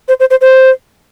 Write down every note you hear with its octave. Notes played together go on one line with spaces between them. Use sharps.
C5
C5
C5
C5